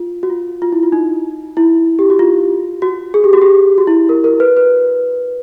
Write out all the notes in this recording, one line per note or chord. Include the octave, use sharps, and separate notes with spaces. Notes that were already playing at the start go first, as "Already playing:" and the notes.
Already playing: F4
F#4
F4
F4
E4
F4
D#4
E4
G4
F#4
F4
F#4
G#4
G4
F#4
G4
F#4
E4
A#4
A#4
B4
B4